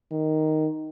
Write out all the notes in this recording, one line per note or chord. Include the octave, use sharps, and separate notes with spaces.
D#3